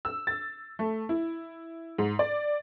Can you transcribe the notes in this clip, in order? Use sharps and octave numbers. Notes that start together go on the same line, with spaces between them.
E6
A6
A3
E4
G#2
D5